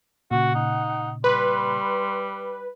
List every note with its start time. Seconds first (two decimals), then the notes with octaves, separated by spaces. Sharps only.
0.31 A#2 C#3 F#4 F#5
0.54 D#4
1.24 G3 B4 C6